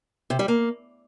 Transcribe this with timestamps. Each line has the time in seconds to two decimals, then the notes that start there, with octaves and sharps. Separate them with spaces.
0.30 C3
0.39 G3
0.48 A#3